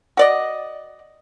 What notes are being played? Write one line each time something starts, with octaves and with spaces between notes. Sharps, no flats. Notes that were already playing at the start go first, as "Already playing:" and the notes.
F#4 D5 D#5